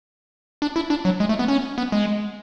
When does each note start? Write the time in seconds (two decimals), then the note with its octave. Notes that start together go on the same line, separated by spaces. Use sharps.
0.62 D4
0.76 E4
0.90 D4
1.05 F#3
1.20 G#3
1.29 A3
1.39 B3
1.48 C#4
1.78 B3
1.92 G#3